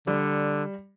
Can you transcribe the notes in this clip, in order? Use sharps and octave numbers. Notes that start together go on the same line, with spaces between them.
D3 G3